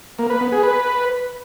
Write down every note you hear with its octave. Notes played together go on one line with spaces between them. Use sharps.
A#3
B4
B3
G#4
B4